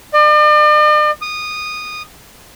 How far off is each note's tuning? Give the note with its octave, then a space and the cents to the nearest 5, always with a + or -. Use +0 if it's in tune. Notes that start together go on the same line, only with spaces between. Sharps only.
D5 +45
D#6 -15